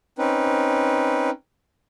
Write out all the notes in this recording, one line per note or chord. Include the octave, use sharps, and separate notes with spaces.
C4 C#4 D#4 B4